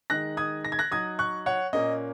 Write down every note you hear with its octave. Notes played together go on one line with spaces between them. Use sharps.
D#3 G#3 D#4 F#6 A#6
D#6 G#6
A#6
G#6
F#6 A#6
F#3 D#4 D#6 G#6
C#6 F#6
C#5 F#5
A#2 A#3 C#4 D#5